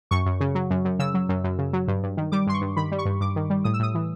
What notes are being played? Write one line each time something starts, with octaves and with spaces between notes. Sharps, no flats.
F#2 C#6
F#2
C#3
F#3
F#2
F#2
C#3 E6
F#3
F#2
F#2
C#3
F#3
G2
G2
D#3
G3 D6
G2 C6
C#6
G2
D#3 B5
G3
C#6
G2
G2 D6
D#3
G3
A2 D#6
E6
A2 D#6
E3